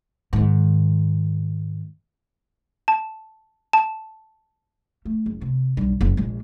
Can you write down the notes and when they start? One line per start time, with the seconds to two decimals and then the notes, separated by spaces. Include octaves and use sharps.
0.33 G#2 D#3
2.88 A5
3.73 A5
5.05 A3
5.26 F#1
5.41 C3
5.77 B1 G2
6.01 F#1
6.17 A#1 G#3